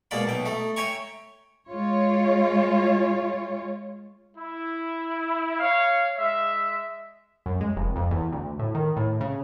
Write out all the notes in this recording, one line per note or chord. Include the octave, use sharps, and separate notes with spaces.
B2 G#3 A#3 D5 B5
B1 B2 G5
A3 D#4
C#5 E5 G5 G#5 A#5 C#6
G#3 F4 C#5
E4
C#5 F5
G#3 E5
F#2
G#3
F1
F2
E2
D2
A2
D#3
A2
C#3